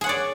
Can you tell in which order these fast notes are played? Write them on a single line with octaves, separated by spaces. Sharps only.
G#4 F#5 C#5 D5